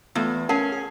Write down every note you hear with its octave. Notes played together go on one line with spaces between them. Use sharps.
E2 A3 B3 F4
C#4 A#4 F#5 A5
G#4